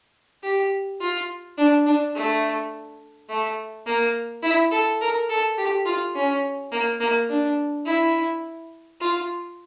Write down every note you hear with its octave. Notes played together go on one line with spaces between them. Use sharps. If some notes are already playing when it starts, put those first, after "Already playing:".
G4
F4
D4
D4
A3
A3
A#3
E4
A4
A#4
A4
G4
F4
C#4
A#3
A#3
D4
E4
F4